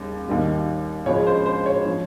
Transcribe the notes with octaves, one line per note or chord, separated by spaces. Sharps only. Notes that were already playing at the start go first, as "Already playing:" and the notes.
Already playing: D#2 C#3 G3
D#2 D#3 G3
C#2 C#3 F3 G#3 C#5
C5
C5
C#5
F3